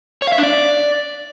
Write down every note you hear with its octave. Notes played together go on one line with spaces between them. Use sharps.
C#5
F5
E5
D4
D5